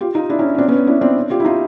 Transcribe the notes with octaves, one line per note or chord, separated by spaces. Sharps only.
F4 G4
D#4 F4
D4 E4
C#4 D#4
C#4
C4 D4
B3 C#4
D4 E4
C4 D4
F4 G4
E4
D#4 F4